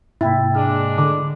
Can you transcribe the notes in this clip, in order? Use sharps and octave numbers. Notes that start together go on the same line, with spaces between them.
G#2 C3 A#3 E4 G5 A6
G#3 D4 F6
D3 D6